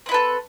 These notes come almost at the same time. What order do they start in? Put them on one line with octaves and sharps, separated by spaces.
C4 E4 B4 A4